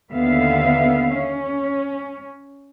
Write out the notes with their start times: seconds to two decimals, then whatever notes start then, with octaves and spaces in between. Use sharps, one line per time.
0.11 D#2 D3 B3 E5 F5
1.15 C#4